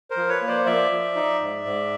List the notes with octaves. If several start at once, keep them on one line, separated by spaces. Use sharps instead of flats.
A#4 C5
F3
B4 C#5
A#3
C5 D5
F3 D5 E5
F3
D#4
G#2
G#2